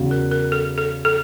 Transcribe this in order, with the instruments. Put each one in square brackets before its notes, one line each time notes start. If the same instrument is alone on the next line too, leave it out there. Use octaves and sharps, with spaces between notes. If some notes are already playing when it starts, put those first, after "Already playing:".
Already playing: [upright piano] E2 C#3 F#3
[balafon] A#4
A#4
A4
A4
A4